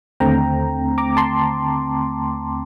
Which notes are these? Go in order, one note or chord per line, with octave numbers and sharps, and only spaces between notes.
D#2 D3 A3 C4 G5 A#5
A#5 D6
A5 C6